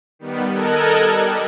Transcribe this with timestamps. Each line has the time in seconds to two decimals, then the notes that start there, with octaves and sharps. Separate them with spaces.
0.19 D#3 G3 B3
0.49 A4 A#4 D#5 A5 F#6 G#6
1.01 G3